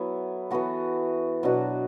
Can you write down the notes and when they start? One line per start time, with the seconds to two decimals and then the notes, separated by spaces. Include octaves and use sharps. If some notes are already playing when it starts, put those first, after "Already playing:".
Already playing: F#3 B3 E4 A4
0.51 E3 B3 F#4 A4
1.43 B2 F#3 D4 F#4